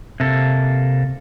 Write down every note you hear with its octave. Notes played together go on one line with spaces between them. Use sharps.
C3 A#3 A4